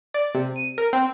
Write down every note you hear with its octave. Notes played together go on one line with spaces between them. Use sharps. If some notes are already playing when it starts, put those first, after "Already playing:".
D5
C3
D#7
A#4
C4